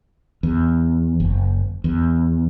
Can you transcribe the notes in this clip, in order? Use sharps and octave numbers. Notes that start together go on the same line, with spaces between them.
E2
F#1
E2